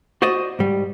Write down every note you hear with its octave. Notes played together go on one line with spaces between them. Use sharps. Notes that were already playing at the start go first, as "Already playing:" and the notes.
F#4 C5 D5 D#5
G#2 G3